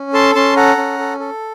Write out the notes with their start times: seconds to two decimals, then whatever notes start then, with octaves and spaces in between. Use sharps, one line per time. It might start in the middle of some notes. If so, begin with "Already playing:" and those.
Already playing: C#4
0.13 A4 A5 C6
0.35 C#4 A5 C6
0.56 A4 F#5 A#5
0.77 C#4
0.99 A4
1.20 A4